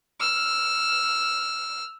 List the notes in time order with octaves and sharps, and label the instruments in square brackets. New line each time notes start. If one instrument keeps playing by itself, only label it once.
[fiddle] E6 F6